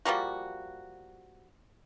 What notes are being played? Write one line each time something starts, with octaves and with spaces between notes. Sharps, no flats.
F3 G3 A#3 F#4